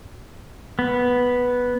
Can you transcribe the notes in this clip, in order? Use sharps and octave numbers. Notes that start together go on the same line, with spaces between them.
B3